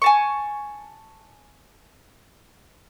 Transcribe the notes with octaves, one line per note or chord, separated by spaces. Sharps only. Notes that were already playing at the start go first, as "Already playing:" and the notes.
G#5 A5 C#6